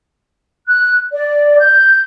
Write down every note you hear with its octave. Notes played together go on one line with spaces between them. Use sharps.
F#6
D5
G6